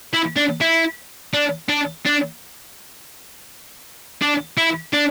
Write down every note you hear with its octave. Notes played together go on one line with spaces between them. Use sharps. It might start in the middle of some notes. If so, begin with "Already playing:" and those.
E4
D4
E4
D4
D4
D4
D4
E4
D4